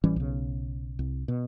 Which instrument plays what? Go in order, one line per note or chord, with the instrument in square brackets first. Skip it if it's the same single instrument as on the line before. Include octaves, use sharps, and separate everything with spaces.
[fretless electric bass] A1 E3 G3 C#4
B1 C#3
C2
B2